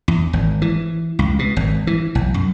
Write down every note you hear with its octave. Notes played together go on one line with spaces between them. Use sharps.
E2
G#1
E3
C#2
B2
G#1
E3
B1
F#2